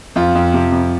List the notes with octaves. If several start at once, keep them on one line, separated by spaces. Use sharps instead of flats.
F2 F4
F2
C3
F2